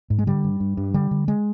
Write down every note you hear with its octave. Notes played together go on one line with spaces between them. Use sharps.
G#2
G#3
D3 G3
G2
G2
G2
D3 G3
D3
G#3